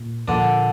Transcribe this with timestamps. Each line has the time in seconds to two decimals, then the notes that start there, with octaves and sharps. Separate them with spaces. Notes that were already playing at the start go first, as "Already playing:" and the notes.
Already playing: A#2
0.28 A#2 D3 F3 A#3 D4